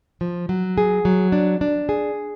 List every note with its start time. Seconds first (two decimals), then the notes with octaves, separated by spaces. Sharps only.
0.21 F3
0.49 F#3
0.78 G#4
1.05 F#3
1.32 D4
1.61 D4
1.89 G#4